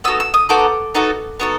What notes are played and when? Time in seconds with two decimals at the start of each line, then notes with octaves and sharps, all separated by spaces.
0.04 B3 D#4 F#4 A4 E6
0.20 E6
0.34 D#6
0.49 B3 D#4 F#4 A4 D6
0.95 B3 D#4 F#4 A4
1.40 B3 D#4 F#4 A4